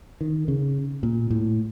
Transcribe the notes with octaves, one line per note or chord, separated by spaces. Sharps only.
D#3
C#3
A#2
A2